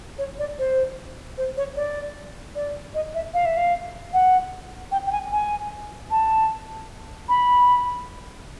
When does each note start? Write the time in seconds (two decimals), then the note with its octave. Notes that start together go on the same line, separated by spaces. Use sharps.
0.18 C#5
0.39 D5
0.59 C5
1.37 C5
1.57 C#5
1.76 D5
2.55 D5
2.94 D#5
3.14 E5
3.34 F5
3.45 E5
3.57 F5
4.13 F#5
4.91 G5
5.06 G5
5.12 G#5
5.32 G#5
6.11 A5
7.29 B5